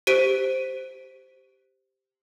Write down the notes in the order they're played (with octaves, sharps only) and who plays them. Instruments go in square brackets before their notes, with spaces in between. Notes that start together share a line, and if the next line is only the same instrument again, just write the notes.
[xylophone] G4 C5 B6 D7 D#7